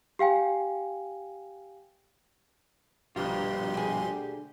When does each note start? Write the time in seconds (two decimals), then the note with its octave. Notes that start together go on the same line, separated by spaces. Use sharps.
0.19 G4 F5 G5 G#5
3.16 A#1 G2 B2 F4 G4 C6
3.74 D2 G#4